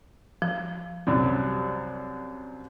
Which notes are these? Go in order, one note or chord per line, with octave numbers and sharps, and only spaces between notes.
F3
C2 F#2 G3